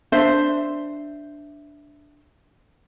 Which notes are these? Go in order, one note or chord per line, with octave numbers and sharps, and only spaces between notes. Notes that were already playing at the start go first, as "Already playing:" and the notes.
D4 C5 E5